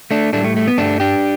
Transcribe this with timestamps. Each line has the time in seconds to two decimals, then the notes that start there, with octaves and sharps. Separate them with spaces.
0.11 A3 D4
0.33 A2 G3 A3 D4
0.44 A3
0.56 A3
0.68 B3
0.78 G2 G3 A3 D4
1.00 D4 G4